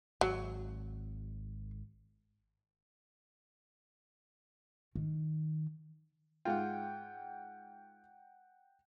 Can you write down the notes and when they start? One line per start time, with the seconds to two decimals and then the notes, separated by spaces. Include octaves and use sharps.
0.21 G#1 F#3
4.95 D#3
6.45 G#2 F4 F#5 G5